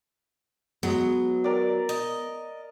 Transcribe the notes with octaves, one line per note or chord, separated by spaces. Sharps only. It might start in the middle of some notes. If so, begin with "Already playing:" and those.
F#3 G#3 B3
A#4 D5
D#5